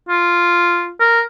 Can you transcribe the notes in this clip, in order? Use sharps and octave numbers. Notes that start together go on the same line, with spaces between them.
F4
A#4